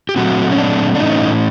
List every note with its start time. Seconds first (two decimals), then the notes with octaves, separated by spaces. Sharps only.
0.09 G4
0.16 A#2 F#3 A3 C4 F#4
0.51 C#4
0.58 D4
0.95 D4
1.00 A2 E3 A3 C#4 D#4